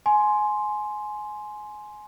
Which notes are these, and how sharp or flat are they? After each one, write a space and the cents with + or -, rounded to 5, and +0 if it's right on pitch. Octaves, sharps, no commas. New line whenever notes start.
G#5 +20 C6 +0